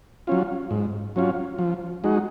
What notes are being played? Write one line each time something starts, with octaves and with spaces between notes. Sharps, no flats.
F#3 C#4 F4
G#2
F#3 C#4 F4
F3
G#3 D#4 F#4